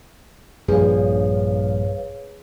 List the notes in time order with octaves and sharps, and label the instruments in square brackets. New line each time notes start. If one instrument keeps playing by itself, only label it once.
[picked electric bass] A#1 G2 F3 [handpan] G#4 [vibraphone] B4 C#5 F5